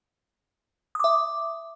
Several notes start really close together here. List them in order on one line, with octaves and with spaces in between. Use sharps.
D#6 D6 E5